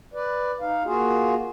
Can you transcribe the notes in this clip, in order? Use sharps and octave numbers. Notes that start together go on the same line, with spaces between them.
B4 D5
D#4 F5
A#3 F4 F#4 G#4